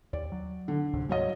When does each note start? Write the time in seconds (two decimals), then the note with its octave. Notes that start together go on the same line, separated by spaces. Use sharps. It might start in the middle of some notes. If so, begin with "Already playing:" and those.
0.13 D#2 D5
0.32 F#3
0.68 D3
0.94 D2 G#2 C3
1.09 F#3 C#5 D#5